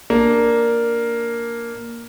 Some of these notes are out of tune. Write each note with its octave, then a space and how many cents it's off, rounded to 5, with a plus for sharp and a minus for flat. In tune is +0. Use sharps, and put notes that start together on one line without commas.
A#3 +0 D4 +0